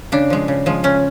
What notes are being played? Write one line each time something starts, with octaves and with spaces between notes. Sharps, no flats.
C#3 D4
F3 G#3
C#3
F3 G#3
C#3 C#4